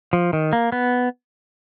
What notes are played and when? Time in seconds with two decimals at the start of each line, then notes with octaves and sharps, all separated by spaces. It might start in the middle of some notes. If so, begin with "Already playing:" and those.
0.13 F3
0.33 D#3
0.53 A#3
0.72 B3